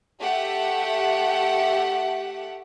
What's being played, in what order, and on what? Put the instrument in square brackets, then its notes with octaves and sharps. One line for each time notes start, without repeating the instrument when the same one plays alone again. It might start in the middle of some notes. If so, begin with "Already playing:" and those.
[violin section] A3 G4 E5 F#5